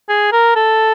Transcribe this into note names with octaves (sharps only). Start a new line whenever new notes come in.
G#4
A#4
A4